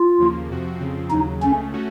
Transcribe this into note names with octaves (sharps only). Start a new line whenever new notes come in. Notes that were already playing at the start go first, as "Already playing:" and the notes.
Already playing: F4
D#2 C#3 F3 A#3
F2 C3 F3 C4 F#4
F2 C#3 F3 C4
D#2 C#3 F#3 D#4
C#2 C#3 A3 C#4
A3 C#4 F#4